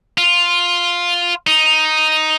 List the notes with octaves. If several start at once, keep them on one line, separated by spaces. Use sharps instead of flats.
F4
D#4